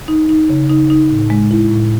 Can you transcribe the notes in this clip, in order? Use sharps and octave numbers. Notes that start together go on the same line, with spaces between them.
D#4
D#4
C#3
D#4
D#4
A2
G#3
E4
A2